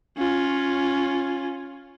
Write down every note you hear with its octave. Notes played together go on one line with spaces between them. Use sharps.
C#4 F4